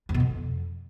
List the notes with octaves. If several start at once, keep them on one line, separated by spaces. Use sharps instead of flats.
E2
B2
F2